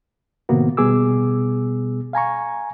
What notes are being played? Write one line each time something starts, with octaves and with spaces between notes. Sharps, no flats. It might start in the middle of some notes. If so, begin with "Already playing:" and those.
A2 C3 D#3 A#3 B3 F#4
B2 G3 B3 G#4 D6 E6
F5 G#5 A#5 C#6